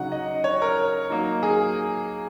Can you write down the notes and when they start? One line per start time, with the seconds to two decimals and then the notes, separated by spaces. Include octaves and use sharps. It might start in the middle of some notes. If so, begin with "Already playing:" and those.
Already playing: C#3 F#3 D#4 F#5
0.12 D#5
0.44 C#5
0.62 A#4
1.10 F#3 A#3 D#4
1.43 G#4